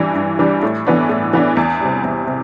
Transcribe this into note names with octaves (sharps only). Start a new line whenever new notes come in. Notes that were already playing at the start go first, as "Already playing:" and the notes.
Already playing: G2 E3 G3 D4
G2
E3 G3 D4
A2
E3 B3 D4
A2
E3 B3 D4
E2
C3 G3
E2
C3